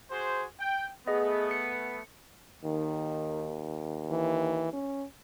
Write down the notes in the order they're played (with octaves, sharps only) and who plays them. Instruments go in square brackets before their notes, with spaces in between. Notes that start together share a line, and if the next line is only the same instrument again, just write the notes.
[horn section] F#4 G#4 C5
G5
[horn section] A3 B3 [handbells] G#4 D#5
[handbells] C#7
[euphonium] D#2 [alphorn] D#3
[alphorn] E3
C#4